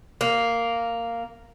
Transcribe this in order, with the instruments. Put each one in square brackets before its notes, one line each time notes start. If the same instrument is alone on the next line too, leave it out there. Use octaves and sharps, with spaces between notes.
[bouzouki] A#3